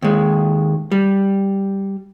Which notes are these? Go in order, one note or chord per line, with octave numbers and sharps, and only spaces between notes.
D#2 G#3
G3